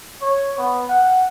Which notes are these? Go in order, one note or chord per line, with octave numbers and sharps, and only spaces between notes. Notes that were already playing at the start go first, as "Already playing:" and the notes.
C#5
B3
F#5